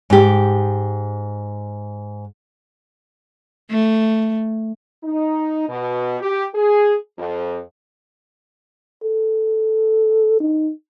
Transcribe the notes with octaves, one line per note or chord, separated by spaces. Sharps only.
G#2 G4
A3
D#4
B2
G4
G#4
F2
A4
D#4